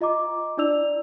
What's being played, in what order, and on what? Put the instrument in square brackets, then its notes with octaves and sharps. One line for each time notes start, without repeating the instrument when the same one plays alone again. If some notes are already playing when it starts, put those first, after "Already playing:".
[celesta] F4 D#5 A#5 D6
D4 E4 D5 E6 F7